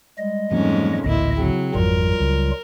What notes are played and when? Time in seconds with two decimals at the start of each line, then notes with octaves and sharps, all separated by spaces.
0.18 G3 G#3 D#5
0.52 F2 G#2 E3 F#3 A#3 C#4
1.04 A1 D2 A#2 E4 D#5
1.38 C#3 F#3 C4
1.75 G#1 F2 F#3 G3 F4 A#4
2.20 C#2